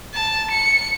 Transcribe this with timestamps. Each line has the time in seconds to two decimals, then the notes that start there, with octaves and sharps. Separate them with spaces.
0.14 A5
0.51 C#7